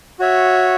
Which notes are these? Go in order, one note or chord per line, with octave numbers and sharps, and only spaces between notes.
F#4 C#5 E5